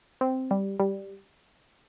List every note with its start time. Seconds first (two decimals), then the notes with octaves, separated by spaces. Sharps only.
0.21 C4
0.51 G3
0.80 G3